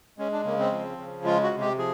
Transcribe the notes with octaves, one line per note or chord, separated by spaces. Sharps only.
G#3 C#4
D4
C#3 A#3
C4
F3
C#3
G#3 F4
F#4
C3
G4
F3 G#4